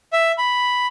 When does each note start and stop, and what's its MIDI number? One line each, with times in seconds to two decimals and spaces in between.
0.13 0.32 76
0.38 0.87 83